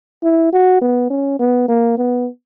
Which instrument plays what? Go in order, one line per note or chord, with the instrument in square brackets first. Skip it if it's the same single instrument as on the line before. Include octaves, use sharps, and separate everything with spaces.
[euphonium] E4
F#4
B3
C#4
B3
A#3
B3